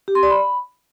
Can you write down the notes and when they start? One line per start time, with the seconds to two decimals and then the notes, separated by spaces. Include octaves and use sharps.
0.08 G4
0.15 C6
0.23 D5
0.30 B5